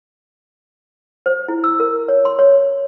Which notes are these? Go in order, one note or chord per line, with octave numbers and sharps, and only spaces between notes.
C5
E4
E6
A#4
C#5
C6
C#5